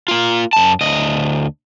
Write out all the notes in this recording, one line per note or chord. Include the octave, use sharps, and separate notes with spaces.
A#3 F4
F#2 A5
D2 D#5